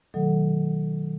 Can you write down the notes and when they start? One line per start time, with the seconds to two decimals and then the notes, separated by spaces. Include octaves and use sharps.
0.14 B2 D#3 F#3 A3 A4 F#5